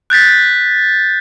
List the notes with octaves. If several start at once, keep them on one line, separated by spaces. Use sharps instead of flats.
F#6 G6 A6 B6